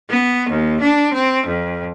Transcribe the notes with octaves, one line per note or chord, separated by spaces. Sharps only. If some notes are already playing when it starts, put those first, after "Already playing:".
B3
D#2
D4
C4
F2